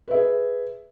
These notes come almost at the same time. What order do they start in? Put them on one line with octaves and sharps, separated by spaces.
B4 E5 G#4